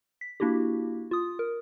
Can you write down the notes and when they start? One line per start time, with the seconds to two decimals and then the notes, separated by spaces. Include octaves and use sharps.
0.21 B6
0.40 A#3 D4 E4 F#4 G4
1.11 F4 D#6
1.39 A#4